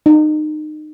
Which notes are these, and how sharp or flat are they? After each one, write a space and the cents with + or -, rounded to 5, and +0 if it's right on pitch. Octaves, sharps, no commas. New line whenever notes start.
D#4 -30